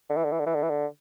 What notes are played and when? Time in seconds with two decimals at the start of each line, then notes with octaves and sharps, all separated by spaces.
0.09 D3
0.16 E3
0.24 D3
0.32 E3
0.40 D3
0.46 E3
0.54 D3
0.62 E3
0.69 D3